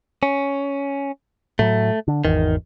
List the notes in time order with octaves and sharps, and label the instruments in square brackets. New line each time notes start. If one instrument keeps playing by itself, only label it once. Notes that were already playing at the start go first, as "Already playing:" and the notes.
[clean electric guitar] C#4
[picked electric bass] A2 F#3 [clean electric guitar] A3
[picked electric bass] D3
[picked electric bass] G#1 E2 [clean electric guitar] D#3